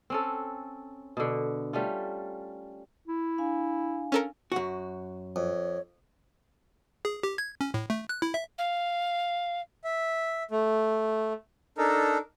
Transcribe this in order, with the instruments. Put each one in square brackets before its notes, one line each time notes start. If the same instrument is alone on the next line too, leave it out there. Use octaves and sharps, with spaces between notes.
[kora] C4 C#4 A4
B2 D3
G3 A3 C#4 F4
[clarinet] E4
[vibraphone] D4 F5 G#5
[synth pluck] C#4 A4 A#4
[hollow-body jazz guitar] F#2 F#4
[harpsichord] F2 [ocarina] C#5
[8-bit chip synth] G#4
G4
G#6
C#4
A2
A3
F#6
E4
E5
[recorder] F5
[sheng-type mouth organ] E5
A3
D4 D#4 A4 A#4